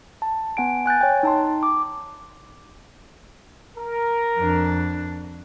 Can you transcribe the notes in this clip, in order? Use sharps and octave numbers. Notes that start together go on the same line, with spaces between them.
A5
B3 F#5 G#5 D7
G#5 F#6 G6 A6
C#5 G5
D#4 A5 C6
D6
A#4
F2 D4